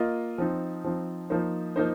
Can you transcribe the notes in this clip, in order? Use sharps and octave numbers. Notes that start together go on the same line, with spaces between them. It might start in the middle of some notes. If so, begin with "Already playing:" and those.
Already playing: A#3 F4 D#5
F3 C4 D#4
F3 C4 D#4
F3 A#3 D#4 C5
F3 A#3 D#4 C5